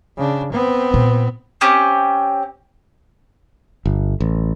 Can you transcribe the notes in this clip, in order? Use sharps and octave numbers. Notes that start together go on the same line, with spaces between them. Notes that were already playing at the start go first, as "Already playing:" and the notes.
C#3 D4
B3 C4
A#2
C4 C#4 G4
G1
A1